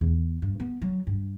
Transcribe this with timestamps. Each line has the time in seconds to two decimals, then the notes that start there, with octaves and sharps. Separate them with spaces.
0.01 E2
0.42 G2
0.60 B3
0.82 F#3
1.07 G2